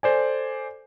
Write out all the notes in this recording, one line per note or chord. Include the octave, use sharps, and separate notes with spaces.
A4 C5 D5 G#5